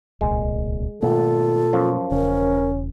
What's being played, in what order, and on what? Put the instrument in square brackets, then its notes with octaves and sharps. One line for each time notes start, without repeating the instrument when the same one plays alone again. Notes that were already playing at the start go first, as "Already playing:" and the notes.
[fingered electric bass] D1 C2 A#2 [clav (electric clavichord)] G#3
[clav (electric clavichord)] G#1 [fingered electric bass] B2 A3 A#3 [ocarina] F4 [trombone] A4
[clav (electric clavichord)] F#2 F3
[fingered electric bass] E1 C#3 [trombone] C#4 [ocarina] A#4